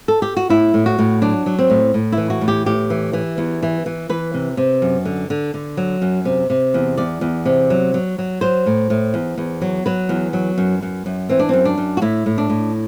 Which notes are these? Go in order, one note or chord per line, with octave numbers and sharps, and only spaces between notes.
A4
G4
F#4
A2 E4
A2
F#4
A2
F#3 D4
F#3
C4
A2
A2
E3 E4
F#4
A2
G4
A2 G4
E3
E3
E2
E3
E3
E3 B4
C3
C3
F#2
D3
D3
D3
F#3
F#2
C3
C3
E2
E2 D5
E2
C3
F#3
F#3
F#3
F#3 C5
A2
A2
E2
E2
F#3
F#3 B4
E2
F#3
F#2
F#2
F#2
E3 C4
D4
F#2 C4
D4
F#2
F#4
A2 E4
A2
D4
A2